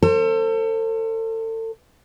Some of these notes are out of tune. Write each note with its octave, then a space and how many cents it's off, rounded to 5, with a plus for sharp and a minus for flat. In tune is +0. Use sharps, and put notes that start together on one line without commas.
A4 +35 C5 +20